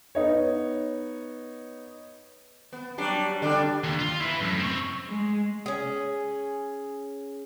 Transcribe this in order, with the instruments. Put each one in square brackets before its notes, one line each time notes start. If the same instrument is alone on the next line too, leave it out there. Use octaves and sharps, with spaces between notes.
[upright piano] B3 D#4 C#5
[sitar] B3
F#3 G3 D4
D3 G3 D4
[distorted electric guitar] D#2
F4
E4 B4
F#2 A2
C4 C#5
[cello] G#3
[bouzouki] C#4 G#4